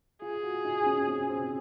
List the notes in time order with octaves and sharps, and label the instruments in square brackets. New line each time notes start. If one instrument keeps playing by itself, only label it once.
[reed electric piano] F4 [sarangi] G#4
[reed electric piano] F#4
D#4
C#4
C4
C4